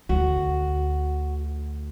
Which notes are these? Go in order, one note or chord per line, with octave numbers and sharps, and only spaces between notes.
D2 F#4